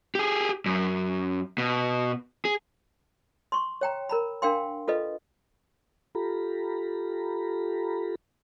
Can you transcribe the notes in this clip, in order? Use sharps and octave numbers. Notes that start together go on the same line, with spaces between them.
G4 G#4
F#2
B2
G#4
C6 C#6
C#5 G5 A#5
A#4 A#5 B5
D4 A#4 F5 G5 C6
F4 A4 B4 D#5
F4 G4 A4 A#5 B5